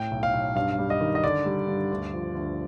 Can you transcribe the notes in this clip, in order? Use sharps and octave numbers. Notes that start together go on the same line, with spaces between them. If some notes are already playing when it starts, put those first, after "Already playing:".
Already playing: A2 G5
B1
F5
B1
G2 F5
G3
D#5
D#3
D#5
D3 D5
G3
G2
D2
F3
D2